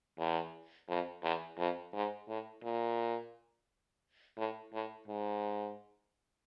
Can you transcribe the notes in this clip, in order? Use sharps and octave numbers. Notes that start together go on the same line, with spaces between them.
E2
F2
E2
F2
G#2
A2
A#2
A2
A2
G#2